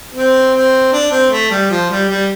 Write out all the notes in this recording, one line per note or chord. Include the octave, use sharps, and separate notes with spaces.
C4
C4
D4
C4
A3
G3
F3
G3
G3